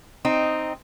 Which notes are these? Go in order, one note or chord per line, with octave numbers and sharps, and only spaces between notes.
C4 D#4